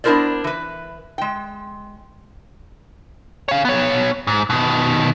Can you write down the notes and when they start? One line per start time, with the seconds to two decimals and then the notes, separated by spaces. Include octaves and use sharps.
0.04 B3 D4 E4 A#4 C5 D5
0.44 E3 B4
1.18 G#3 G5
3.49 C#5 F5
3.65 B3 C#5
4.27 G#2
4.50 B2 D#3